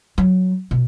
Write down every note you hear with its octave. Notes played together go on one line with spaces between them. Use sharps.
F#3
B2